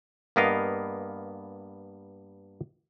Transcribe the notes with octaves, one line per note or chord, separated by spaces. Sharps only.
G2 A#3 B3 A#4 D#5 F5